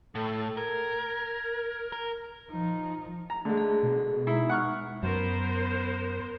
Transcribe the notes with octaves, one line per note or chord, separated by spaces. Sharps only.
A2 A4
A#4 G#6
A#4
F3 D#4
A#5
D3 G#3 A3
G#4
B2
G#3 D#4 E4 A#5
F#5 C#6 F6
F#2 B3 A#4 C5